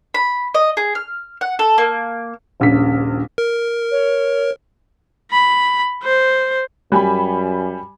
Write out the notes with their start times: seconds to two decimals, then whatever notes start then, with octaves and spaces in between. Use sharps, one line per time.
0.14 B5
0.54 D#5
0.77 G#4
0.95 F6
1.41 F#5
1.59 A4
1.78 A#3
2.60 D#1 A#1 C#3 B6
3.38 A#4
3.91 C#5
5.32 B5
6.03 C5
6.92 F#2 G3 G#5 B5